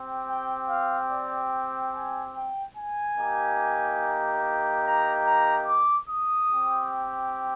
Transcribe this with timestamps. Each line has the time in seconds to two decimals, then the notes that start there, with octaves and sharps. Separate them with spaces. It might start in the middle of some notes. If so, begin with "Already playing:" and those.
Already playing: C4 G4
0.27 G5
0.68 F5
1.10 D5
1.93 G#5
2.35 G5
2.76 G#5
3.18 A#3 D#4 G4
4.84 A#5
5.26 A#5
5.68 D6
6.09 D#6
6.51 C4 G4